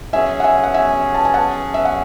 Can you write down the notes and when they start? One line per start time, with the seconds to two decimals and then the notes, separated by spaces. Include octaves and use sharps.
0.13 F#3 C#4 G#4 E5 G#5
0.40 F#5
0.44 E5 G#5
0.64 F#5
0.74 E5 G#5
1.15 A5
1.25 G#5
1.34 F#5 A5
1.74 E5
1.85 F#5